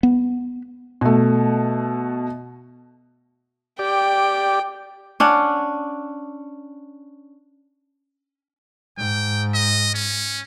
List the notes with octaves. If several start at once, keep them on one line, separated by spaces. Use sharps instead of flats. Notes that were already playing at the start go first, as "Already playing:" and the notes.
B3
B2 A3
G4 D5 G5
C#4 D4 F#5
G#2 G5
D#5
C#4